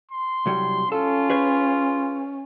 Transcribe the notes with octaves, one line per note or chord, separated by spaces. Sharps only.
C6
C2 F#3 G3
C#4 F4 A4
G#4 B4 C#5